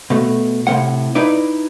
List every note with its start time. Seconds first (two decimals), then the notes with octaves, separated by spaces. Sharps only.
0.10 B2 A3
0.67 A2 C3 A3 A#3 F#5
1.15 D#4 E4 B4 D5